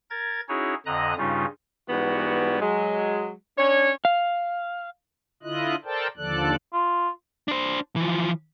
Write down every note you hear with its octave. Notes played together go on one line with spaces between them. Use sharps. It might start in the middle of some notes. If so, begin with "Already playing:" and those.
A#4 G#6 A6
C#4 D#4 E4 F#4 G#4 C#5
F2 D3 D#5 A#5 D#6 F#6
G2 C#3 G3 C#4 D#4 F4
G#2 E3 G3 B3 F#4
F#3 G#3
C#4 D4 C#5
F5
D3 E4 F4 D#5 F#6
A4 A#4 C5 D5 G5 A5
D#2 D3 F3 A4 D5 F#6
F4
D4 C5
E3 F3